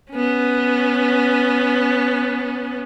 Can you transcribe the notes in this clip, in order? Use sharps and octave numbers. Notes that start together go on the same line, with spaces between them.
B3 C#4